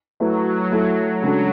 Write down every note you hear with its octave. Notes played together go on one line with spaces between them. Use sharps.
F#3 A3 E4 B4
A3 E4 A4
C#3 F#3 G#3 D4 A4